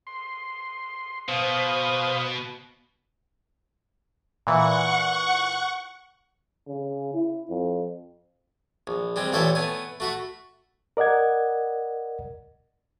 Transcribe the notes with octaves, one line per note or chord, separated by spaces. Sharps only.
C6
B2 C5 F5 D#6
A#2 E3 F#5 C#6
C#3
E4
F2
A#1
G3 G#3 C4
A1 A#2 E4 A4 C#5 G5
A3 B3 G#5
A3 F#4 B5
A#4 D5 D#5 F#5 G#6